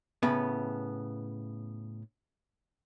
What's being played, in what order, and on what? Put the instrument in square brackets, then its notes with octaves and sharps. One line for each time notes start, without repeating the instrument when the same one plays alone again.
[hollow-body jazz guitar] A2 C#3 B3